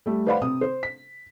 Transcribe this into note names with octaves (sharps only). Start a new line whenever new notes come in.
G3 A3
B4 C5 D5 F5 F#5 B5
C3 C4 D#6
C5
B6